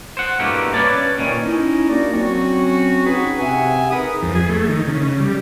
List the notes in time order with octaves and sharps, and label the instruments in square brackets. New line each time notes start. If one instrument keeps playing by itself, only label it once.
[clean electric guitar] C5 F#5
G2 B2 A3 A#3 E4 G4
C#4 B4 C#5 D5 A5
A#2 D#3 C#4
[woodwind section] C#4 D#4 E4
A#3 D4 D#4 F#4 A#4 D5
F#3 C4 C#4 F#4
C#4 D#4 F#4 G#4 B4
C3 C4 G#4 E5 F#5 G#5
D#4 G#4 A#4 B4 B5 D#6
[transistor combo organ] F2
G#4
A3
D#3
C#3
G3